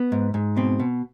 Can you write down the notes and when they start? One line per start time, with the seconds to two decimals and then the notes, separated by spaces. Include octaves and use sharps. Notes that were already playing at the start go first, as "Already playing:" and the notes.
Already playing: B3
0.12 G#2
0.34 G#2
0.57 B2 C4
0.80 B2